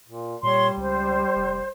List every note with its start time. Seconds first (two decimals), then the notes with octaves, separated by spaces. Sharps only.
0.08 A#2
0.43 A#2 G3 C#5 C6
0.77 C#2 C5
1.36 F1